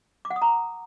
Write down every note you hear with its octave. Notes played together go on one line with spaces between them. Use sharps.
D6
F#5
D#6
A#5